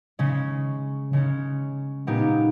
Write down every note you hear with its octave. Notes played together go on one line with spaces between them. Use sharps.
C#3 G#3 C#4
C#3 G#3 C#4
A#2 G#3 B3 D#4 G4